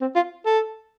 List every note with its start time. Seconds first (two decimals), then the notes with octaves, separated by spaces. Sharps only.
0.01 C4
0.15 F4
0.46 A4